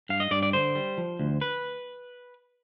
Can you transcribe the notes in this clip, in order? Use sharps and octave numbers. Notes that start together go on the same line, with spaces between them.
G2 F5
D#5
G2 D5
D5
D3 C5
G3
F3
D2
B4